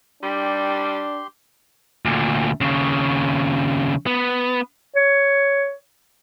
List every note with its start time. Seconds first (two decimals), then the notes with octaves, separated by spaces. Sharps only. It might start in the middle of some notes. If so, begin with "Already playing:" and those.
0.23 G3 D4 G4 C6
2.05 D2 A#2
2.61 D#2 C#3
4.06 B3
4.96 C#5